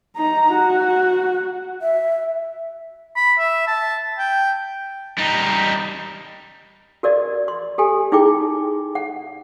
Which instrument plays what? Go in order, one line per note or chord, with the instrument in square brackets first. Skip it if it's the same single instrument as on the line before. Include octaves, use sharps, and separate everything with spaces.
[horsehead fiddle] D#4 A#5
F#4
[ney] E5
[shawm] B5
E5
A5
G5
[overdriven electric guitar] G3 D#4
[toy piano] F#4 A#4 D5 D#5
C6
G4 A4 G#5
D#4 E4 G#4 G5 D6
F#5